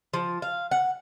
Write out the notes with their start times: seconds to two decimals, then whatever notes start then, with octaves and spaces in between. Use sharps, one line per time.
0.14 F3
0.42 F5
0.71 F#5